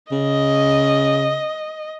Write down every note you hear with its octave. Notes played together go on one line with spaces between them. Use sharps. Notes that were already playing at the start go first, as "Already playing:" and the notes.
C#3 D#5